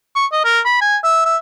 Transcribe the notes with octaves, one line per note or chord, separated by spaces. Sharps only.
C#6
D#5
A#4
B5
G#5
E5
E5